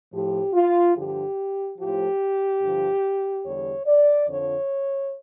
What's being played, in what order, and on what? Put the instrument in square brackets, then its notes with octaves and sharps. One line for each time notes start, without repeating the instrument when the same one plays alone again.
[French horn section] A2 F3 G4
F4
G2 D3 F3 G4
A2 F3 G4
G2 D3 F3
E2 D3 G3 C#5
D5
F2 D3 F3 C#5